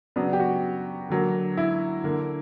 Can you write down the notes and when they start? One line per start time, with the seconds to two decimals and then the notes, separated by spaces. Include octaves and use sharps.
0.16 C#3 F#3 B3 D4
0.33 G4
0.40 F#4
1.10 D3 F#3 A#3
1.57 E4
2.04 D3 A#3